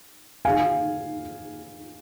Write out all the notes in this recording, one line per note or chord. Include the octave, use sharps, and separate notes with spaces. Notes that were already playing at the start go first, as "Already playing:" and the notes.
F5 G#5